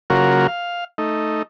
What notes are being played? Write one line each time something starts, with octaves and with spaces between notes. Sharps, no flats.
C#3 F#3 A#3 F4 F#4 A#4
F5
A3 D#4